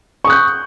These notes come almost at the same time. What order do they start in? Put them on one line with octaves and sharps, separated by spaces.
C#6 D#6 F#6 G6